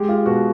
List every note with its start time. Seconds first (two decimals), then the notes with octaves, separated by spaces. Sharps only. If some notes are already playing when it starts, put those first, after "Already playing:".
Already playing: G#3 G4
0.09 F4
0.26 B2 F#4